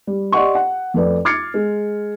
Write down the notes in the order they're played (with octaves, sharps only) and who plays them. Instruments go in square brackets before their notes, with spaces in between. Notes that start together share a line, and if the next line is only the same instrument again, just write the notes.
[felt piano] G3
G4 D5 D#5 F#5 C6 C#6
F#5
F2 A3 B4 D5
D6 F6 G#6 A6 C7 C#7
G#3